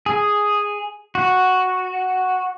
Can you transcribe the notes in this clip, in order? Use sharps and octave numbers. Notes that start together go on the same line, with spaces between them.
G#4
F#4